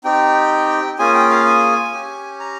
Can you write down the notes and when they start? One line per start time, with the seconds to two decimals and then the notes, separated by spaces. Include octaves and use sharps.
0.04 C4 D#4 G4 G5
0.99 A#3 C#4 F4 G#4 G#5
1.14 G5
1.30 F5
1.46 G#5
1.93 C#4 G4
2.40 A#5